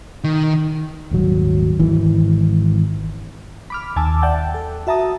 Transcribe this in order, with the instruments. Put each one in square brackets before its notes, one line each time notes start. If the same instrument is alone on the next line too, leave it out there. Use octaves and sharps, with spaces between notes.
[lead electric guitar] D#3
[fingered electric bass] D#1 G#1 F#3
G#1 E3
[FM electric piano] B5 D6 F6
D#2 G#5 A5 D6 E6
D5 E5 F#5 G5 A5
A4
F#4 E5 A5 A#5 D#6